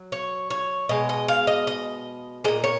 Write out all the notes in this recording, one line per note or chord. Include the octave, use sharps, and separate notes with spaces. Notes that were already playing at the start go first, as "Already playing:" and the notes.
Already playing: F#3
C#5
C#5
B2 G#3 D#5
D#5
F5
D#5
D#5
A#2 G#3 D#5
C#5